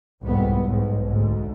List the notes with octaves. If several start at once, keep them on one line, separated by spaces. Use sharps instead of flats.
C2 F2 G#2 B3
B1 G#2
D2 G#2